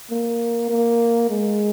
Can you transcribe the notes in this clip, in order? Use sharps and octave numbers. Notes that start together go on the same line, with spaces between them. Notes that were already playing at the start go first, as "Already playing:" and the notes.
A#3
A#3
G#3